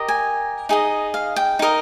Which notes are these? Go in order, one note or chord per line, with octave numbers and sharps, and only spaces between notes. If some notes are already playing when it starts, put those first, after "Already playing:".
Already playing: G4 A#4 D#5
G#5
D#4 G#4 D#5
F5
G5
D#4 A#4 D#5